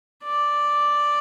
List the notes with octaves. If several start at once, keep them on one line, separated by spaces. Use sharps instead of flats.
D5